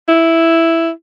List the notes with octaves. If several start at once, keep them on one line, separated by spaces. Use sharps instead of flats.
E4